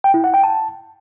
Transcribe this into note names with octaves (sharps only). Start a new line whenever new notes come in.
G5
E4
F#5
G5
A5